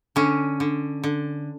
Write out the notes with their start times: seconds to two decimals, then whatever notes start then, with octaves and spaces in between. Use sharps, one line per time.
0.16 D3 C#4
0.60 D3
1.03 D3